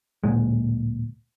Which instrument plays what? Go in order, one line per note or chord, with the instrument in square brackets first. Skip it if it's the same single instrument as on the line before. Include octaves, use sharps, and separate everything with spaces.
[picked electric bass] D1 A#2 G#3